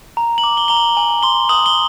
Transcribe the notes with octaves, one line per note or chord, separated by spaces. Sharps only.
A#5
F#7
D6
G7
A#5 G7
F#7
G#5 F#7
C6 G7
D#6 F#7
G7